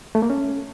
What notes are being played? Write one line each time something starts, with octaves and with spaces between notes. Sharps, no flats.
A3
A#3
C#4